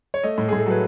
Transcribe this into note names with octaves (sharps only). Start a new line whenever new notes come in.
C#5
A3 D#5
A2
A2 G#4
A4
F#3 B4